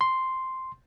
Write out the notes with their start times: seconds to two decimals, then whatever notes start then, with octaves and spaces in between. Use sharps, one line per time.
0.01 C6